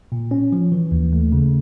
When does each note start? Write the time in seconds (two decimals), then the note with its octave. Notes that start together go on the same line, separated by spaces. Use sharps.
0.12 A#2
0.31 C#4
0.52 F3
0.72 E3
0.92 D#2
1.13 A3
1.32 C#3